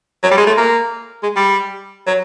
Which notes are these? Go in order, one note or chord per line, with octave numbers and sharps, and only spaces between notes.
F#3
G3
G#3
A3
A#3
G#3
G3
F#3